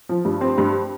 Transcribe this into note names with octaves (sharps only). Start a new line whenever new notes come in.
F3
G2
C4
G2